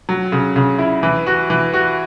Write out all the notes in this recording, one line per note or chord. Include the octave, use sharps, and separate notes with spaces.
F#3
C#3
C#3
E4
E3
F#4
E3
F#4